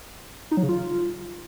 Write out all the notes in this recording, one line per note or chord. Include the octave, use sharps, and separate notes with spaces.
D#4
F#3
C#3
F4